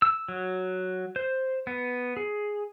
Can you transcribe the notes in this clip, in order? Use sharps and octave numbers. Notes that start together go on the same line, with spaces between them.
E6
F#3
C5
B3
G#4